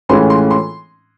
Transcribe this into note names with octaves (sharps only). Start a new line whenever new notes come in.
A2 E3 G#3 C#4 F4 C6
C6
C6